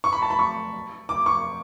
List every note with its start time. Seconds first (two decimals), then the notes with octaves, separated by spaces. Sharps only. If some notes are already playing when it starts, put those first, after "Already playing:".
0.04 C#6
0.12 B5
0.22 A5
0.30 B5
0.39 C#6
1.09 D6
1.26 C#6